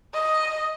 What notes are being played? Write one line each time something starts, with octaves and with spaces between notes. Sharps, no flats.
D#5